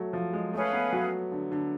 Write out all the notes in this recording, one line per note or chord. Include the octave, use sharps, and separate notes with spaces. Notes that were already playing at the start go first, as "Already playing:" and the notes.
Already playing: F#3 A3
F3
G#3
A3 C#4 G#4 B4 F5
B3
F#3
D3
D3